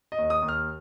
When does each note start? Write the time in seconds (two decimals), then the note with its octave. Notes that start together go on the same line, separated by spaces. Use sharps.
0.12 D#5
0.18 D#2
0.30 D#6
0.42 D#2
0.48 F6